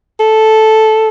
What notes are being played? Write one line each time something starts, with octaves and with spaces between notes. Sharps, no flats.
A4